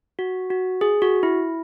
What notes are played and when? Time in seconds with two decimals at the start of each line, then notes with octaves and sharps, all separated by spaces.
0.19 F#4
0.50 F#4
0.81 G#4
1.02 F#4
1.23 E4